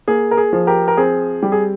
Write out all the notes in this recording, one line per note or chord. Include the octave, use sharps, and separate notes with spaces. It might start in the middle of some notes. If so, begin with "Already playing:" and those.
A#3 G#4
A#4
G#4
F3
G4 A#4
A#4
C4 G#4
G3 G4
G#4